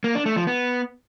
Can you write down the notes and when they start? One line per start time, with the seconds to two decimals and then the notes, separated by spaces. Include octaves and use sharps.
0.04 A#3
0.15 D4
0.26 A3
0.36 F3
0.47 B3